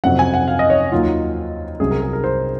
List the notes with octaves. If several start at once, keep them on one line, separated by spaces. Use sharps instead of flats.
F2 C3 F#3 F#5
G#5
F#5
F5
D#5
C#5
D#2 D#3 F#3 F4
C2 C3 F#3 G#4
A#4
G#4
A#4
C5